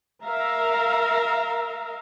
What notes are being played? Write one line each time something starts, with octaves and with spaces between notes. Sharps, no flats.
A#4 E5 F5 A#5